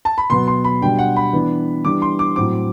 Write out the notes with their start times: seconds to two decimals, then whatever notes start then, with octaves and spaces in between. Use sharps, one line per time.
0.05 A5
0.18 B5
0.30 B2 F#3 B3 C6
0.48 C6
0.64 B5
0.81 B2 G3 D4 G5
0.99 F#5
1.16 B5
1.33 E3 B3 D4
1.85 E3 G3 D4 D6
2.02 C6
2.19 D6
2.36 A2 F#3 C4 D6